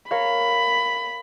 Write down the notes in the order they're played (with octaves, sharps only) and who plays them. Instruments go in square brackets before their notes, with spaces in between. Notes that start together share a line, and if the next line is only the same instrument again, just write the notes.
[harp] A#4 C#5 F5 [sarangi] B5